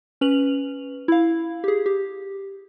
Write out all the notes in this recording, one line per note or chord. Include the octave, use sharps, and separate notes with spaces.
C#4 B4 F7 F#7
E4 F5
G4 G#4
G4